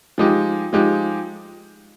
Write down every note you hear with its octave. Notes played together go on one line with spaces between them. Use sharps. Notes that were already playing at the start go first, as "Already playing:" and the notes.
F3 G#3 D#4 G4
F3 G#3 D#4 G4